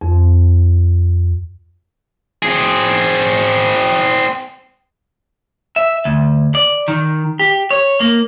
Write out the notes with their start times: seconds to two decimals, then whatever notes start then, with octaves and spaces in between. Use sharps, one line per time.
0.01 F2
2.43 C4 G#4
5.76 E5
6.05 D2
6.55 D5
6.88 D#3
7.39 G4
7.71 C#5
8.01 A#3